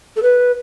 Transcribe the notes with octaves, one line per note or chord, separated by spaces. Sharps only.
A4
B4